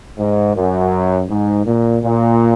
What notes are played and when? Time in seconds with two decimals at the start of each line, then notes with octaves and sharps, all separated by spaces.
0.18 G#2
0.55 F#2
1.29 G#2
1.66 A#2
2.03 A#2